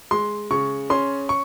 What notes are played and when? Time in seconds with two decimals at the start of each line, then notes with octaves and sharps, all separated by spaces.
0.11 G#3 C6
0.51 C#3 C#6
0.90 C#4 C6
1.29 C#6